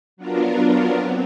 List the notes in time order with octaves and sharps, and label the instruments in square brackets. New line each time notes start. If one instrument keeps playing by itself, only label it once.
[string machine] F#3 B3 D4 F4 A#4
C4